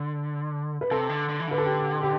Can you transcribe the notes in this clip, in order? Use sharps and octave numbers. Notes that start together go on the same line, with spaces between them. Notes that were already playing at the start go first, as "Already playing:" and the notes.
Already playing: D3
B4
C3 A4
D3
D3
E3
D3 B4
A4
G4
G4